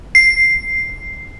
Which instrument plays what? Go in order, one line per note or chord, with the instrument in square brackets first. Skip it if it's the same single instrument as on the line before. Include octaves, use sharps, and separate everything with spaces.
[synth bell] C7